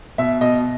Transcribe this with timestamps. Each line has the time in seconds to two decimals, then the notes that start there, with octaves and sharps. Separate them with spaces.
0.18 B2 E5
0.41 B2 D#5